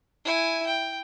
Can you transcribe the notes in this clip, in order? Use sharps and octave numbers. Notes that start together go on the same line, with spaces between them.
E4 G#5
G5